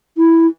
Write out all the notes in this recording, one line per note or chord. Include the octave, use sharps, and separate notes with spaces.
E4